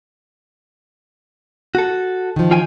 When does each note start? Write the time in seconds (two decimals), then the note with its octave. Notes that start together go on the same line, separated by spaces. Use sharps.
1.75 F#4 A4
2.36 D#3 F3
2.51 F4 G5 G#5